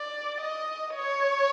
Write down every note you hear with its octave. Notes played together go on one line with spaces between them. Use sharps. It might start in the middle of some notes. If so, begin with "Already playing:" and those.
Already playing: D5
D#5
C#5